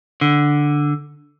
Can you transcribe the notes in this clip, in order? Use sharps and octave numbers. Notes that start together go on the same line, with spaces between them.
D3